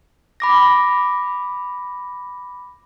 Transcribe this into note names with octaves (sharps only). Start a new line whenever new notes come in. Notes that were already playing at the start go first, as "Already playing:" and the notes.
B5 D6 A#6